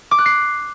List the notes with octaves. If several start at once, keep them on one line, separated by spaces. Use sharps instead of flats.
D6
F#6
C7